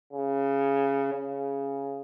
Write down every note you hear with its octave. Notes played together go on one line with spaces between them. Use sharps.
C#3
C#3